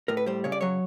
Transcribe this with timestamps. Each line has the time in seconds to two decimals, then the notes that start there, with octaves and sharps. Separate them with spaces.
0.08 A2 A#4
0.17 B4
0.26 G3 C5
0.44 C#3 C#5
0.52 D5
0.61 F#3 C#5